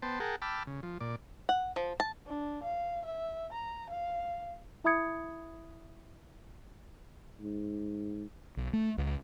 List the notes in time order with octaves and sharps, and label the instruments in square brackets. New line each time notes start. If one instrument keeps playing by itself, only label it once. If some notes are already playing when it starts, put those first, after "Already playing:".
[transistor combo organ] B3 C5 G5 A5
G#4 A#4 F#5 G5 A5
G5 A5 B5 D6 E6 F6
C#3
F3
A#2 D5
[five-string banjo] F#5
F3
A5
[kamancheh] D4
F5
E5
A#5
F5
[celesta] E4 E5 B5 D#6 G#6 C#7
[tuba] G#2
[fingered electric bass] B1
A3
C#2